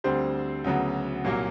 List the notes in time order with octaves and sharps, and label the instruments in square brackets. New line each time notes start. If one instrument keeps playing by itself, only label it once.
[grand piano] D2 D3 G3 C4 C5
D2 C#3 F#3 B3
C2 A#2 F#3 A#3